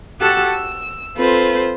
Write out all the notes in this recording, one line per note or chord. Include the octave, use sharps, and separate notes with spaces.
F#4 G4 A4 F#5 A5 E6
E6
C4 F4 A4 B4 C5